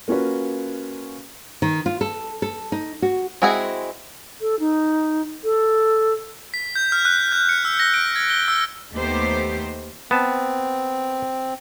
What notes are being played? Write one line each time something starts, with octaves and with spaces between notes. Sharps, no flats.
A#3 C#4 F4 F#4 B4
D#3
F4
A4
A4
D#4
F#4
G#3 C4 E4 F#4 G#4
A4
D#4
A4
B6
G6
F6
F#6
G6
C#7
E6
A#6
D7
G#6
G7
E6
D#2 A3 B3 D#4 G4 C5
B3 C4 A5